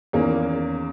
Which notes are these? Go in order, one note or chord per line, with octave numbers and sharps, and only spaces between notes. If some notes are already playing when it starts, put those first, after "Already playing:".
E2 D#3 A#3 C#4